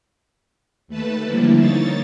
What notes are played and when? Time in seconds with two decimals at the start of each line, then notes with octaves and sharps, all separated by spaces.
0.88 D#2 A3 B4 A5
1.23 D3 F3 G3 A#3 E4
1.55 A#3 D#4 C#5 A6